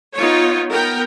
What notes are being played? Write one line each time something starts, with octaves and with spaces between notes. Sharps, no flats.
B3 D#4 F4 C#5
B3 A#4 G5